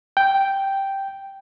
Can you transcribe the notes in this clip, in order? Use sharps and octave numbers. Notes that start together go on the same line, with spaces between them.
G5